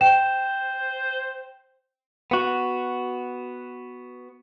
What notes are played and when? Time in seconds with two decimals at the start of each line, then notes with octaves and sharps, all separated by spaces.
0.01 C5 G5 E7
2.31 B3 F#4